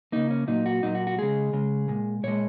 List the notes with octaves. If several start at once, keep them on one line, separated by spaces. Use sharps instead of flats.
C#3 A#3 D#4
C#4
A#2 F#3 A#3 D#4
F#4
A#2 F#3 A#3 D#4
F#4
F#4
C#3 G#3 G#4
C#3 G#3
A#2 G#3
A#2 G#3 C#5